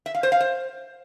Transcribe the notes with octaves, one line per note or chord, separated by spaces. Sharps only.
E5
F5
C5
F5
C5